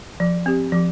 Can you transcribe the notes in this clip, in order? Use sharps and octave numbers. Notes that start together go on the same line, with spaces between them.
F3
C4 G4
F3